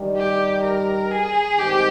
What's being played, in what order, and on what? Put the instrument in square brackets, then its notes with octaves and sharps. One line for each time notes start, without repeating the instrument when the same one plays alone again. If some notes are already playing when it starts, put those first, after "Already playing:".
Already playing: [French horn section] G2 D#3 G3
[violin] G4
A#4
G#4
[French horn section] G2 D#3 G#3 C4 D#4 [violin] G4